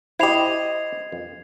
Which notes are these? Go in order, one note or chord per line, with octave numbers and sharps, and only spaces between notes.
E4 G4 C5 D#5 G#6 C7 F7
F2